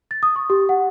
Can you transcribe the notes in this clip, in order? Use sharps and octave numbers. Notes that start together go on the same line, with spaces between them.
A6
D#6
C#6
G4
F#5